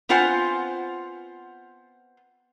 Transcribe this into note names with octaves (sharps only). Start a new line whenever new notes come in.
B3 C4 F4 C5 F#5 G#5